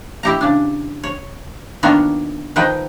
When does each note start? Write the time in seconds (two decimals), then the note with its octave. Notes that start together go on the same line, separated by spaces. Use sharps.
0.23 E4 G4 A#5
0.41 C#3 D4
1.03 C#5
1.83 D#3 A#3 B3 D4 F4 C#5
2.56 D#3 F3 D#4 B4 G5